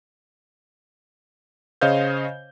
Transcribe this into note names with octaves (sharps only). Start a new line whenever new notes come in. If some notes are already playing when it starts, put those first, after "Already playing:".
C#3 C5 C#5 D#5 F5 G6